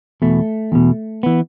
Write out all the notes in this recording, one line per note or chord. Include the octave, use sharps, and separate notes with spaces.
E2 B2 A3
E2 B2
E3 B3